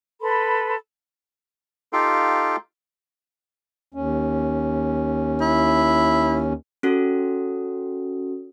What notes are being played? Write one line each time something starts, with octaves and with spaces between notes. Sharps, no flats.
A4 B4 B5 C6
D#4 F4 G4 A4 F5 G5
D#2 C#4
E4
C#4 F#4 A4